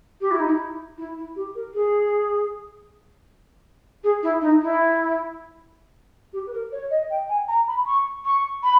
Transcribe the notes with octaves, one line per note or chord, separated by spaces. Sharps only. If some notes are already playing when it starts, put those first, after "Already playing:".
G4
E4
D#4
E4
E4
E4
G4
A#4
G#4
G#4
E4
D#4
E4
G4
B4
A#4
C#5
D#5
G5
G#5
A#5
B5
C#6
C#6
B5